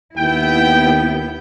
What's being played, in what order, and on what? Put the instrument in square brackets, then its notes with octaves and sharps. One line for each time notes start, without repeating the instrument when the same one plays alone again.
[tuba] D#2 [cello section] B3 E4 [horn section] G5